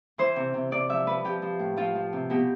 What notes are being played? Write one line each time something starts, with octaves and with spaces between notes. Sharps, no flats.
E3 C5
C3
C3
C3 D5
F3 E5
F3 B4
F3 G4
F3
A2
F3 F4
F3
C3
B2 G4